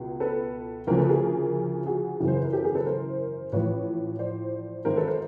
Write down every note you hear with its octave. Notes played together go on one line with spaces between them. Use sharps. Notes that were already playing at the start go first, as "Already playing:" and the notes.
Already playing: C#2 B2
A4 B4
D2 C#3 F3 A#4 C5
A4 B4
G#4 A#4
F#4 G#4
G#1 F#2 C#3 E3
C5
B4
A#4
G4 A4
G#4 A#4
A4 B4
A#4 C5
A1 A2 F3 B4 C#5
C5 D5
G#1 G#2 D#3 A#4 C5
A4 B4
A#4 C5